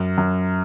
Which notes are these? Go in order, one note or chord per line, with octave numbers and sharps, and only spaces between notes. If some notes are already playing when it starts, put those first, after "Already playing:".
Already playing: F#2
F#2